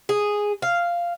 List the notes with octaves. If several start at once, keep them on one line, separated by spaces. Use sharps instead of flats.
G#4
F5